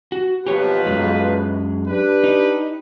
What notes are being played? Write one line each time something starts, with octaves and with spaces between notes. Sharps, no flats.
F#4
B1 F3 G4 B4 C#5
F#2 G#3
D4 G4 B4
D#4